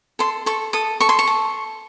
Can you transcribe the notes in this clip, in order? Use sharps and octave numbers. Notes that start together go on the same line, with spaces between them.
A4 C6
A4 C#6
A4 D#6
A4 C#6
C6
C#6
A4